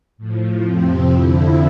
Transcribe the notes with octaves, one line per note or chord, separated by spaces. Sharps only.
A2 F3
F2 C3 F3 C4
F2 D3 F3 E4